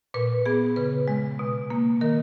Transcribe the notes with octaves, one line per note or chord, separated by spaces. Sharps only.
A#2 B4
B3 G#4
C#3 B4
G#3
B2
A#3
D#3 A#4